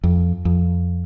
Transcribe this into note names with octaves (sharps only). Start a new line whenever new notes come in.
F2
F2